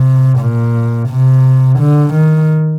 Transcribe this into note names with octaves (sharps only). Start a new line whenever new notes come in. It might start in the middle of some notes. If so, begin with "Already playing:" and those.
Already playing: C3
A#2
C3
D3
D#3